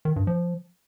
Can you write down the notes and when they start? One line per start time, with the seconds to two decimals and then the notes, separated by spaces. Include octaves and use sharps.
0.05 D#3
0.16 G2
0.27 F3